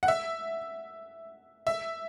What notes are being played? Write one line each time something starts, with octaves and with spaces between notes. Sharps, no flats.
F#5
E5
E5